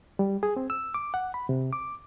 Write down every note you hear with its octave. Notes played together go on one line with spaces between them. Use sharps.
G3
G#4
C4
E6
D6
F#5
B5
C3
D6